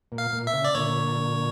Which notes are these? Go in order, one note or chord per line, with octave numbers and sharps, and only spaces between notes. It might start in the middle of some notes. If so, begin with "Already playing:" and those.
A#2
F5
A#2
E5
C#3
D5
A#2 D3 C#5